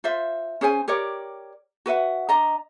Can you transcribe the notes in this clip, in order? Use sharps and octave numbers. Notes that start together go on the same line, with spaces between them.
F4 C5 E5
C#4 G#4 C5 G#5
G4 A#4 C#5 D5
F#4 B4 E5 F#5
D4 D#5 A#5